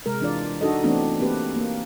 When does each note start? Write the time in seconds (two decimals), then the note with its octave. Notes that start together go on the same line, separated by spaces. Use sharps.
0.06 C3 G#3 A#4
0.21 E3 D4 F4 D5
0.61 D4 D#4 F#4 A4 D#5
0.84 E3 A3 B3 C4 D4 F#4
1.20 A#3 C4 G4 B4
1.56 A#3